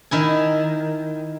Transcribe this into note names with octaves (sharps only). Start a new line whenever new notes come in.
D#3 E4 G#5